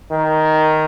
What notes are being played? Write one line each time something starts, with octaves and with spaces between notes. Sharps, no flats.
D#3